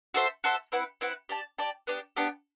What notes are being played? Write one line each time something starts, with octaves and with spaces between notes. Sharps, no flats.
F#4 A4 C5 E5
F#4 A4 C5 E5
C4 E4 B4 F#5
C4 E4 B4 F#5
G4 D5 A5
G4 D5 A5
B3 D4 G4
B3 D4 G4